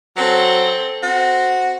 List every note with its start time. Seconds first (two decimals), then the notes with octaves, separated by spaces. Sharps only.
0.17 F#3 C4 A4
1.03 C4 F#4